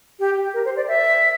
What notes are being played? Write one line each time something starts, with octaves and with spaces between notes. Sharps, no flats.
G4
A#4
C5
D5
E5